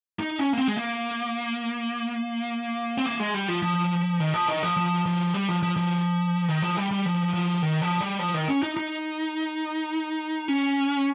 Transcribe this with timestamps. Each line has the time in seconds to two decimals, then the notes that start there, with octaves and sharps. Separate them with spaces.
0.20 D#4
0.39 C#4
0.53 A#3
0.58 C4
0.68 G#3
0.77 A#3
2.97 C4
3.06 A#3
3.20 G#3
3.34 G3
3.48 F3
3.62 F3
4.20 D#3
4.34 F3
4.48 D#3
4.63 F3
4.77 F3
5.06 F3
5.34 G3
5.48 F3
5.63 F3
5.77 F3
6.49 D#3
6.62 F3
6.77 G3
6.91 G3
7.05 F3
7.34 F3
7.62 D#3
7.82 F3
8.01 G3
8.19 F3
8.34 D#3
8.48 C#4
8.63 D#4
8.77 D#4
10.48 C#4